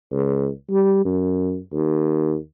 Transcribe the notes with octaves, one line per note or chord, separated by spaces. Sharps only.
C#2
G3
F#2
D#2